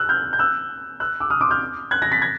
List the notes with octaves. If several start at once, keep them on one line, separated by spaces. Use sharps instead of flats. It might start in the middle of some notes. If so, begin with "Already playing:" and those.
Already playing: E6 F#6
F6 G6
G6
E6 F#6
E6 F#6
D6 E6
D#6 F6
C6 D6
F6 G6
F#6 G#6
G#6 A#6
A6 B6
G#6 A#6